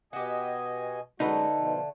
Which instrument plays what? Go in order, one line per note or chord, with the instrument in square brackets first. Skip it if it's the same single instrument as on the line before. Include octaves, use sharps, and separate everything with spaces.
[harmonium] B2 D#5 G#5 [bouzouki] F#4 G4
[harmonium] F#2 G#3 F#4 [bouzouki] D3 A3 [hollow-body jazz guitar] D#4 B4
[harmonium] B2 F3